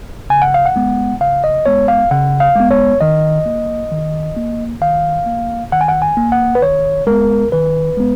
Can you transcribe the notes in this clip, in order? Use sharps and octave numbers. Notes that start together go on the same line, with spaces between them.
C#3 G#5
F#5
F5
F#5
G#3 B3
C#3 F5
D#5
G#3 B3 C#5
F5
C#3 F#5
F5
G#3 B3
C#5
D#3 D#5
A#3
D#3
A#3
D#3 F5
A#3
D#3 F#5
G#5
F#5
G#5
A#3
F#5
B4
D#3 C#5
G#3 B3 A#4
D#3 B4
G#3 B3